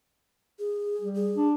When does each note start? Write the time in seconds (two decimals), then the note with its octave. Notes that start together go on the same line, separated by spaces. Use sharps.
0.59 G#4
1.01 G3
1.15 G#4
1.35 D4